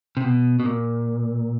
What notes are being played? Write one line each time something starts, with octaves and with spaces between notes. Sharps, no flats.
C3
B2
B2
A#2